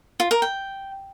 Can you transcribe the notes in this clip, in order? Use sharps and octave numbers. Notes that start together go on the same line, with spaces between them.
F4
A#4
G5